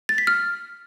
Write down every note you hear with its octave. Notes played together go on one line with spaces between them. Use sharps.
A6
B6
F6